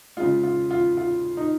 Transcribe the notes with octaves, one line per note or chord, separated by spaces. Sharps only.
C#3 G#3 F4
F4
F4
F4
D#4